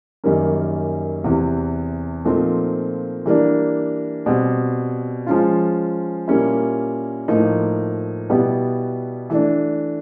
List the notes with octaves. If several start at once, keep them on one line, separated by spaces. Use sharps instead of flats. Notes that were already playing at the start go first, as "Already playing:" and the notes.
F#2 D#3 G3 A#3 C#4
E2 C3 E3
A#2 F3 A3 C4 D#4
E3 G3 A#3 D4
B2 G3 C4
F3 G#3 C#4 F4
A#2 G3 A#3 C#4 E4
A2 F3 A#3 D#4
B2 G3 B3 E4 G4
E3 A3 D4